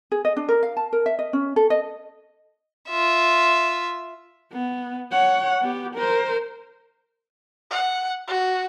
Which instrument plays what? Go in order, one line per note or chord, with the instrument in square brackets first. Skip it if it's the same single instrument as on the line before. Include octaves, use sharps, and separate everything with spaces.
[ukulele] G#4
D#5
D4
A#4
F5
A5
A#4
E5
D#5
C#4
A4
D#5
[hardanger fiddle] F4 E5
[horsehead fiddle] B3
C#5 F#5
B3 G4
A#4 C5
[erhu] F#5
F#4